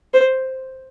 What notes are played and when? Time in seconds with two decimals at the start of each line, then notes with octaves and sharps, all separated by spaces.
0.14 C5